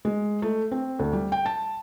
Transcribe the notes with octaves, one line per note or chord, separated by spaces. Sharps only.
G#3
A3
C4
D2
G3
G5
A5